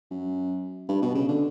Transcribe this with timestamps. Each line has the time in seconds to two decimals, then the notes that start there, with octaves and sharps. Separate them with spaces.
0.11 F#2
0.89 G2
1.02 B2
1.15 C#3
1.28 D3